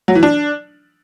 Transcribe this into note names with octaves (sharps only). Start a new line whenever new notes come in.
F#3
E3
D4